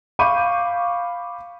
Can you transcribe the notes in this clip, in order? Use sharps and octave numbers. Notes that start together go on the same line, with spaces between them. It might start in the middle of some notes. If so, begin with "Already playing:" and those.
F5 B5 C#6 D6 G6 D#7